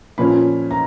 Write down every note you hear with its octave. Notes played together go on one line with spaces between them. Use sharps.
A#2 F3 A#3 C#4 B5
A#5